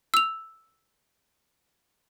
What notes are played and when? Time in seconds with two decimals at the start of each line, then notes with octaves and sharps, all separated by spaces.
0.14 E6 F7